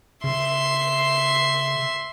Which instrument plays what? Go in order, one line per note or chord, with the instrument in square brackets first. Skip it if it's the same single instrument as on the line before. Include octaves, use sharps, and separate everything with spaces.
[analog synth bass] C#3 [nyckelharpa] E5 C6